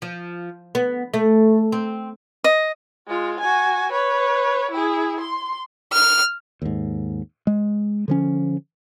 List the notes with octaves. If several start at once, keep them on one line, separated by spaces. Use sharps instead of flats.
F3
B3
A3
C4
D#5
G#3 F4
F#4 G#5
B4 C#5
E4 G#4
C6
F6
D#2 G#2
G#3
D3 F3 C#4